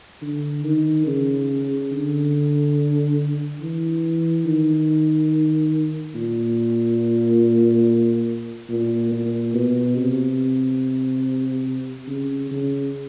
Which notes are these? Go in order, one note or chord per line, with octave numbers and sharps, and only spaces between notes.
D3
D#3
C#3
D3
E3
D#3
A#2
A#2
A#2
B2
C3
C#3
C#3